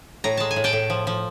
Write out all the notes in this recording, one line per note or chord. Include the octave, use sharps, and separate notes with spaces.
A2 A#5
G#3 A5
G#5
A2
G5 A5
A2
F3
F3